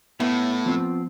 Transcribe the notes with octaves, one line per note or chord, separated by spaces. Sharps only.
A2 B3 E4
F3 C4